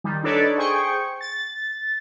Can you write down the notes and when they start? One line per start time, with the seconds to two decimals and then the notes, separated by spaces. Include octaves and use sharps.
0.04 D#3 G3
0.23 D4 D#4 A4 B4 C#5 D5
0.58 G#4 C5 G5 C#6
1.21 A6